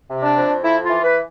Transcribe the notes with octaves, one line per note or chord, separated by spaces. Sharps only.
C3
D4
F2
F2 E4
F4
E3
B4